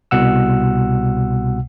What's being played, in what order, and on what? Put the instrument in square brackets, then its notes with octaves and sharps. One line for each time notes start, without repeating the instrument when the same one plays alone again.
[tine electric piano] C2 B2 F#5 E6